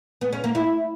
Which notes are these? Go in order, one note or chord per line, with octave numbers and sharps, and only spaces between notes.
B3
C#4
A#3
E4